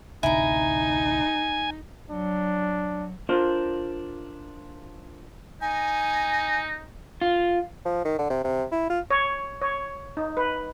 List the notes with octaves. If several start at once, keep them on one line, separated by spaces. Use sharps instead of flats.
A1 D2 C3 D#4 E4 G#5 A#5
F#3 D4
D4 F4 A#4 C5 D5
D#4 G#5
F4
F3
D#3
D3
C3
C3
E4
F4
C#5
C#5
D#4
B4